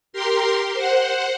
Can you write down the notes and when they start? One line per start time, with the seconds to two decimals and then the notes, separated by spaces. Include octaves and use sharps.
0.13 G4 A#4 C6
0.74 C5 F#5